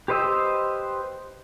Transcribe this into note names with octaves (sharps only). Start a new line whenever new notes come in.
G4 B4 C5 D#5 E6